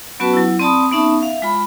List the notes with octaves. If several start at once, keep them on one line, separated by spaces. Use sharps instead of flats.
F#3 B3 C#4 F#4 B4 A5
F#3 E4
C4 D5 A5 B5 D#6
B3 C#4 D#4 E5 A5 B5
E5 F5
G#3 F4 B5